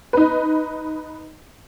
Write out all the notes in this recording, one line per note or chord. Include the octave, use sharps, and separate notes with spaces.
D#4 B4